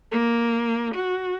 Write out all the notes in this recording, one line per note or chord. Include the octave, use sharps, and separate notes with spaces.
A#3
F#4